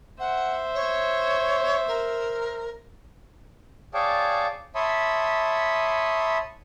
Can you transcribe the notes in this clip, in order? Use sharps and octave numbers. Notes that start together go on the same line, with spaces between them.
C5 E5 F#5
C#5
A#4
G#4 C#5 D5 F5 G5 A5
C#5 E5 A5 B5 C6 D#6